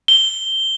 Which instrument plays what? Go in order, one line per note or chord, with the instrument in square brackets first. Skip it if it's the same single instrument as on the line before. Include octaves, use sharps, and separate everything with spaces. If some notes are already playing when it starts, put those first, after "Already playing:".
[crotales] G7